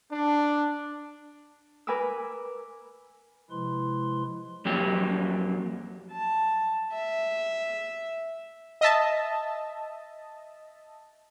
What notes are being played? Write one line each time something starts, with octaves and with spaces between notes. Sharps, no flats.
D4
A#4 B4 G#5 B5 D6 E6
C3 F3 G#3 E4 B4 C6
F2 F#3 A#3 G4
A5
E5
D#5 E5 A5